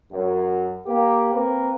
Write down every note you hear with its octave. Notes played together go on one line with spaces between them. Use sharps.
F#2
A#3 G4
A#3 C4 A#4 B4